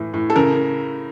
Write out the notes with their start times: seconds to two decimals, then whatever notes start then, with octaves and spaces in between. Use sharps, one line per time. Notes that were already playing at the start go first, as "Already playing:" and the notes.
Already playing: A2 E3
0.14 A2
0.30 A4
0.36 C#3 A#4